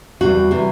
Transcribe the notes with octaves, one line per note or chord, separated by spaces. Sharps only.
E2 C3 E3 G3 F#4
C3 E3 G3